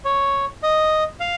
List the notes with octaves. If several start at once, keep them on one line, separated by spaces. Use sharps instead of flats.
C#5
D#5
F5